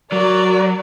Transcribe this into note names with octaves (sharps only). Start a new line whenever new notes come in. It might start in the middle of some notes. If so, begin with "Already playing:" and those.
F#3 F#4 A#4 D5